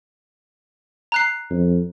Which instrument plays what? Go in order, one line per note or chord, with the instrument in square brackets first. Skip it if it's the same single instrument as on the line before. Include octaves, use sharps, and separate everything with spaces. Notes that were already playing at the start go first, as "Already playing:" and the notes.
[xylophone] A#5 F#6 C7
[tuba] F2